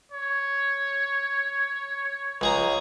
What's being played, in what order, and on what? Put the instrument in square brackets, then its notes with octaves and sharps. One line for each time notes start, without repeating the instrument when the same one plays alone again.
[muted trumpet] C#5
[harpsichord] C#2 G#4 A#5